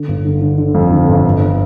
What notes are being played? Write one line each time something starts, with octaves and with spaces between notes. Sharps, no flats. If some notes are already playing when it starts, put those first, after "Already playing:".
Already playing: D3
G1
D3
D3
D3
F2
D3
G1
G1